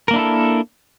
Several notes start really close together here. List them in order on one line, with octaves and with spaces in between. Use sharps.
A#4 A#3 D4 E4 A4